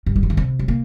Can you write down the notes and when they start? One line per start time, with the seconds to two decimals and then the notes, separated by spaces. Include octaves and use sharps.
0.07 G2
0.16 G3
0.23 F3
0.30 D#3
0.37 C3
0.59 G3
0.68 A#3